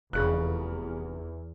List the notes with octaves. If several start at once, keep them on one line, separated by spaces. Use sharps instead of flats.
F1 E2 C#3 F#6